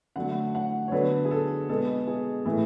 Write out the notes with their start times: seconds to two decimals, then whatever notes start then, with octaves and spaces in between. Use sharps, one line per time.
0.16 D3 F#3 A3 F#5
0.55 F#5
0.88 C#5
0.92 D3 F#3 B3 B4
1.25 G#4
1.31 A4
1.69 B2 G#3 B3 A4
2.07 G#4
2.46 A2 E3 A3